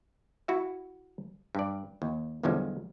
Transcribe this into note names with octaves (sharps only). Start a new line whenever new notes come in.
E4 F#4 E5
G2 D5
D#2
B1 E2 D3 F3 G3 G#3